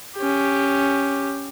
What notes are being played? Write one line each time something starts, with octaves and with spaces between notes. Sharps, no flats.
C#4 G4